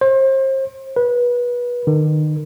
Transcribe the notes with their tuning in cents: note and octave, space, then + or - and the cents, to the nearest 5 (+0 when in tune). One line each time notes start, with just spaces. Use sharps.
C5 +35
B4 -25
D#3 -30